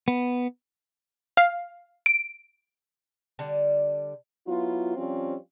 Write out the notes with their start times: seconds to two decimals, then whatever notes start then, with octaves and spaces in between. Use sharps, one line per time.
0.08 B3
1.37 F5
2.06 D7
3.39 D3 G3
4.46 F#3 B3 E4 F4
4.96 F3 G3 C4 C#4 F4